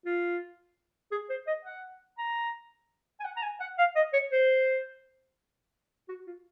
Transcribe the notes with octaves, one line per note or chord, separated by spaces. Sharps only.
F4
G#4
C5
D#5
F#5
A#5
G#5
F#5
A#5
G#5
F#5
F5
D#5
C#5
C5
F#4
F4